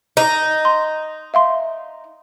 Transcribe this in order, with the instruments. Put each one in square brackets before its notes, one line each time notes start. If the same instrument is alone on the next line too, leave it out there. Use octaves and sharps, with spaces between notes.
[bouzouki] D#4
[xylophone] C6
E5 F5 C6